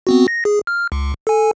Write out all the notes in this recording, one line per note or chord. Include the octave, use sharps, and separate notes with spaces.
B3 C4 F#4
A#6
G#4
F6
C#2
A4 G#5